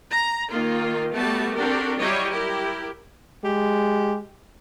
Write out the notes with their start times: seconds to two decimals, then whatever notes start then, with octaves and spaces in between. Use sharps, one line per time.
0.11 A#5
0.51 D#3 A#3 F4
1.12 G3 A3 B3 F#4 A5
1.56 C4 D4 F#4 G4 A4 A#4
1.99 F#3 G3 E4 G4 C#5 D#5
2.30 E4 G4 A#4
3.44 G#3 G4